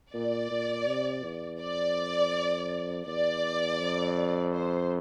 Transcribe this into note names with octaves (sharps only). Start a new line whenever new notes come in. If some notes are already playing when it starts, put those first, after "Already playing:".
A#2 D5
A#2
C3
E2
F2 D5
E2 D5
F2
C5